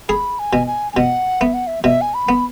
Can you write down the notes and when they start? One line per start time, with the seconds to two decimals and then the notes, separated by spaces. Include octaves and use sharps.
0.09 G#4 B5
0.39 G#5
0.53 B2
0.67 G#5
0.93 G#5
0.96 B2 F#5
1.41 B3 E5
1.54 F#5
1.67 E5
1.84 B2 E5
2.01 G#5
2.14 B5
2.29 B3